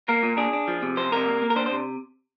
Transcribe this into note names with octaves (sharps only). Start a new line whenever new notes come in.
A#3 A#4
A#2
D4 G#4
D4
F3
C3
F2 C5
C3 A#4
A#3
A#3
A#4
D4 C5
C5
C3